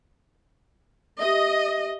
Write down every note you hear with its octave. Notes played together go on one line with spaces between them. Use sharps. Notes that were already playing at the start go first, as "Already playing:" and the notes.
G4 D#5 E5